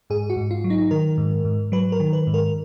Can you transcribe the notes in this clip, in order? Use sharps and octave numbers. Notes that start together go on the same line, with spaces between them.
G#2 G#4
F#4
G#2
F4
F#3
D#4
D#3 A#4
G#2
G#2
F#3 B4
A#4
D#3
B4
G#2
A#4